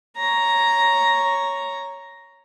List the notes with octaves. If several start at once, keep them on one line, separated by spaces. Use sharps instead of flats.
C#5 A#5